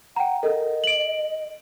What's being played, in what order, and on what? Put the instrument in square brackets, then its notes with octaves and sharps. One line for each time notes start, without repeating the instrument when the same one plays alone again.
[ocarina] F#5 [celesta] G5 A#5
[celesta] A4 A#4 [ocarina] D#5
[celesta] D7 F#7